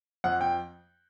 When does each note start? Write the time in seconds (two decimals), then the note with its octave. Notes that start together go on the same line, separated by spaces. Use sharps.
0.24 F2 F#5
0.41 G5